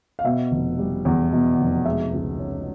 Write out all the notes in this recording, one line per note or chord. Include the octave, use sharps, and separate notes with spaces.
F5
B2 E5
F1
G3
E2
B2
F1
G#3 E5
C#2
C#4